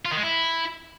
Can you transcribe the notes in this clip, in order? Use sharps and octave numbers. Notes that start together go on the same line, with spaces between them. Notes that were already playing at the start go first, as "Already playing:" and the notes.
F4
D#3
G#3
E4